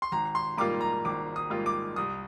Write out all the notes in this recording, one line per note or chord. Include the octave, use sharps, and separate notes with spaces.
C6
G#1 A#5
C6
G#2 G3 A#3 F4 D6
A#5
G#1 D6
D#6
G#2 G3 A#3 F4
D6
C2 D#6